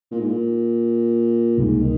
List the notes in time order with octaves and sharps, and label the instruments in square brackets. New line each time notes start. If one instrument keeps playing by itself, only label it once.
[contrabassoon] A#2
G#2
A#2
[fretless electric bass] C#2 C3 G3 A#3 [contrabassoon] G#2
[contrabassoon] D#3